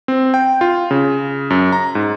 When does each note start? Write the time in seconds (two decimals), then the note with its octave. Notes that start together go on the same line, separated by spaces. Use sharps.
0.08 C4
0.34 G5
0.61 F4
0.91 C#3
1.50 F#2
1.72 A#5
1.95 G#2